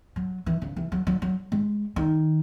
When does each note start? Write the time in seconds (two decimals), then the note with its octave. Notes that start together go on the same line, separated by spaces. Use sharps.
0.16 F#3
0.46 E3
0.62 C#3
0.76 E3
0.92 F#3
1.07 F#3
1.22 F#3
1.52 G#3
1.96 D#3